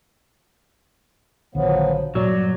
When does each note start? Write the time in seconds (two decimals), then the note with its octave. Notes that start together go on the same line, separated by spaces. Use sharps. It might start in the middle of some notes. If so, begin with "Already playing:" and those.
1.55 A#1 D3 D#3 F3 F#3 B3
2.15 G2 A#2 F#3 D5